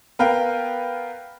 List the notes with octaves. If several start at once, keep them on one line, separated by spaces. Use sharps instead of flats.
B3 A#4 B4 F5 G5